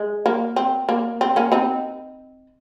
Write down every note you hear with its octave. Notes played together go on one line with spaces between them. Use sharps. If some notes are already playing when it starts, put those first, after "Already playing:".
Already playing: G#3
A#3
C4
A#3
C4
A#3 C#4
C4 D#4